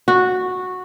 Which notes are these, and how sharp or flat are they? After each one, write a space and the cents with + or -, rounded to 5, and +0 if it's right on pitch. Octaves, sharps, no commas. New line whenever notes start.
F#4 -10